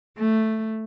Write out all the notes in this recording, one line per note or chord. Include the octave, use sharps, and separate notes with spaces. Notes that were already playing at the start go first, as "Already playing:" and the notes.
A3